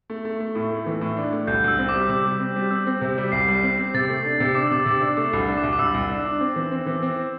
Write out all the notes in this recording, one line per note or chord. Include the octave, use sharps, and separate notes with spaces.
A3
A3
A3
A2
A3
E3
A2
D4
A3
C2 G6
C2 E6
C4
D6
G3
E6
C3 D6
G3
C4
G3
C4 E6
C4
C3
G3
C2 C7
G3
C4
C4
C3 A6
A3
D4
C3
D4 D6
E6
C3 D6
E6
C3 D6
D4
A3 D6
C2
D4
D6
C2
D6
C2 E6
C2
D4
D4
C4
E3
C4
E3
C4